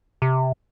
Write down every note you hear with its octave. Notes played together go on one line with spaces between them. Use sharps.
C3